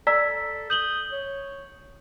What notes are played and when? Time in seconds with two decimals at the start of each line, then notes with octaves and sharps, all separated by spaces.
0.07 A4 D5 A#5 E6 B6
0.70 D#6 G6 F#7 G7
1.12 C#5